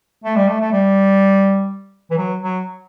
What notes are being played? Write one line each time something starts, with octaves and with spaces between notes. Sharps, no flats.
A3
G3
A3
A3
G3
E3
F#3
F#3